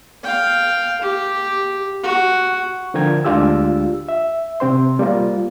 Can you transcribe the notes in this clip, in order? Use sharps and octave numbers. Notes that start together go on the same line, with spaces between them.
F5 G5
G4
F#4
D3 F3 A#4 G5 G#6
D2 G#3 D4 F4 G4 E6
E5
C3 C4 C5 C6
G3 A#3 F4